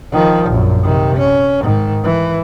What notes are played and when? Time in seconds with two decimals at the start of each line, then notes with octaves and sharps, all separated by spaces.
0.12 D#3 F3
0.50 A#1 F#2
0.84 C3 D#3
1.17 C#4
1.63 G#2 D#3
2.04 E3